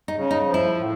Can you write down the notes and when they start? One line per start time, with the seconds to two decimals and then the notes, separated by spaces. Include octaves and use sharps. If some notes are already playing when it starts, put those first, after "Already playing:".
0.08 D#4
0.16 C#3
0.31 D#4
0.46 F3
0.54 E4
0.76 A2